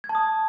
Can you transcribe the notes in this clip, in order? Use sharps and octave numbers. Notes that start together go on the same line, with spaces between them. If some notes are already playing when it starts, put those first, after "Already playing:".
G#6
A5
D#6